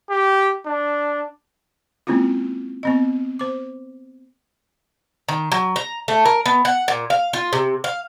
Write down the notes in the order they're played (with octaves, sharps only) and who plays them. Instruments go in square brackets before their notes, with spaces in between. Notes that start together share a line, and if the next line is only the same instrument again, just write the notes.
[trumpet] G4
D4
[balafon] G#3 A#3 C4 C#4 E4 F4
B3 C4 D#5
C5 D6
[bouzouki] D#3
F#3
A#5
A3
A#4
B3
F#5
A#2
F5
F4
C3
F5